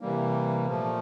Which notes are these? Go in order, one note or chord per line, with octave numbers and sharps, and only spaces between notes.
C3 E3 G3 A#3
A#2 F3 A3